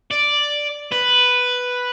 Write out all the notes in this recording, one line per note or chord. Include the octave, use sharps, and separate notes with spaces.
D5
B4